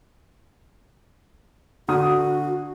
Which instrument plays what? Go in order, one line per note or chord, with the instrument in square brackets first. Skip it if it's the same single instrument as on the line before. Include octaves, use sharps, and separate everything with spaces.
[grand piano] D3 D#6 [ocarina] F#4